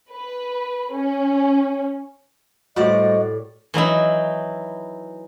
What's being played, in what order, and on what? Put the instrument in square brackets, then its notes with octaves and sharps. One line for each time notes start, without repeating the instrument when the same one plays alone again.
[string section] B4
C#4
[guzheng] A2 G4 D5 [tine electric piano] G3 A3 C5 [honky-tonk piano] F#4 [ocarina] D#5
[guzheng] E3 F#3 D#4 E4